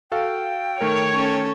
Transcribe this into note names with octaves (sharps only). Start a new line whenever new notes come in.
F#4 A4 F5 G5
D#3 A3 A#4 C#5
C#4 A4